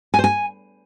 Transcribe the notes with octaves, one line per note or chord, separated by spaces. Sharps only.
G#5
C5
G#5